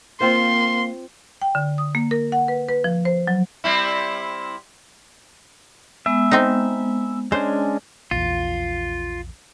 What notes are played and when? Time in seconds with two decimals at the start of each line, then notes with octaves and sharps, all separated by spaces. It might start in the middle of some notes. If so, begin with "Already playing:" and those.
0.21 A#3 C4 F4 C5 C6
1.41 G5
1.55 D3
1.78 D#6
1.95 A#3
2.11 A#4
2.32 F#5
2.48 B4
2.69 B4
2.84 F3
3.05 C5
3.27 F#3
3.64 G3 C4 E4
6.06 G#3 B3 E5
6.31 C4 D#4
7.32 G#3 C#4 D4 C5
8.11 A#1 E2 F4